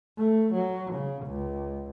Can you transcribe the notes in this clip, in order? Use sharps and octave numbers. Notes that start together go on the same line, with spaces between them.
A3
F#3
C#3
C#2